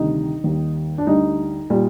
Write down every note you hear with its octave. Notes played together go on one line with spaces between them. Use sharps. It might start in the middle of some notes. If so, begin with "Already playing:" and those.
Already playing: D2 C3 D#3 G3 D#4
D#2 D#3 G3
D4
D2 D3 G3 D#4
A#2 G3